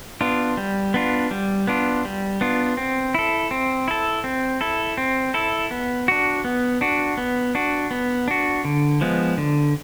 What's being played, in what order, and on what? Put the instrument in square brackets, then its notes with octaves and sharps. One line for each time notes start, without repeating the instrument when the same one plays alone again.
[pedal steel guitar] B3 D4 F4
G3
B3 D4 F4
G3
B3 D4 F4
G3
B3 D4 F4
C4
E4 A4
C4
E4 A4
C4
E4 A4
C4
E4 A4
B3
D4 F#4
B3
D4 F#4
B3
D4 F#4
B3
D4 F#4
D3
F3 G#3 B3
D3